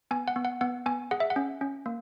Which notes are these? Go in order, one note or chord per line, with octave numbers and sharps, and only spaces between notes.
B3 G#5
F#5
B3
F#5
B3 F#5
B3 G#5
G#4 F#5
E5
F#5
C#4
C#4
A#3